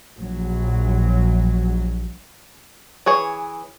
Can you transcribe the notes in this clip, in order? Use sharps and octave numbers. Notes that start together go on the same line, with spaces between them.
A#1 F#3
E3 G#4 C#5